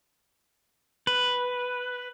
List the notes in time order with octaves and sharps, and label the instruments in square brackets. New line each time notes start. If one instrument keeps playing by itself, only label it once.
[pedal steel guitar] B4